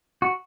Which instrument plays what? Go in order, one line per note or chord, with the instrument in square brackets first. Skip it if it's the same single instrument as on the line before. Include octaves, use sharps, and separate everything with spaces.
[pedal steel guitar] F#4